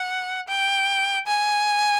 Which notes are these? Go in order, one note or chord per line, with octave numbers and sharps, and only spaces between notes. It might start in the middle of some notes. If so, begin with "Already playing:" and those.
Already playing: F#5
G5
G#5